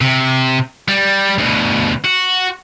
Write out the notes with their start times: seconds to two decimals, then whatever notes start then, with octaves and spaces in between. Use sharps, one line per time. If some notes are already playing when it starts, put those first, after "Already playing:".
0.01 C3
0.88 G3
1.39 D2 B2
2.05 F#4